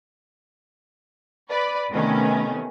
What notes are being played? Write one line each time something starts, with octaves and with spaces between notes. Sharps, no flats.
B4 D5 B5
C3 D#3 A3 B3 C#4